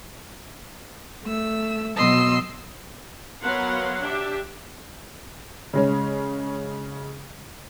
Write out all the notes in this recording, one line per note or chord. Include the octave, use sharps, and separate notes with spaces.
A3 E6
B2 F#3 D#5 C6 E6
F#3 B3 A#4 F5 F#5 C6
D4 G4 E5
C#3 G#3 C#4